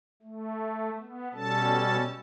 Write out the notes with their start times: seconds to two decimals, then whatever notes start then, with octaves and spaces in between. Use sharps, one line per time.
0.22 A3
0.99 B3
1.34 B2 G3 C#4 A4 A5